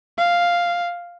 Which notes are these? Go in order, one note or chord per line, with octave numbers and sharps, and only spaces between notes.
F5